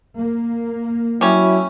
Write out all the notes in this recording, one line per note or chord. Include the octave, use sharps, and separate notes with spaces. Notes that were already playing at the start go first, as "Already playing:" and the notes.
A#3
F#3 G3 C#4 E4